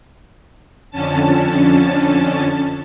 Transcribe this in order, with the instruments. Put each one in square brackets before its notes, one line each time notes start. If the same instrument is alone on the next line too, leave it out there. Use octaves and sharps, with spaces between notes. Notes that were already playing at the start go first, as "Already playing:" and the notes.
[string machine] F2 D3 C#4 A5